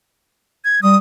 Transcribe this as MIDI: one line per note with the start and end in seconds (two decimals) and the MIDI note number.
0.65 0.81 92
0.83 0.97 55
0.83 0.97 87